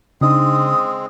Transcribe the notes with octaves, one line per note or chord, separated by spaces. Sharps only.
C#3 G#3 C4 D4 D#4 D#6